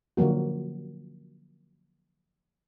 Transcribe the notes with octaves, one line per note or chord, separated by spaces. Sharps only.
D3 F3 F#3 A#3 F#4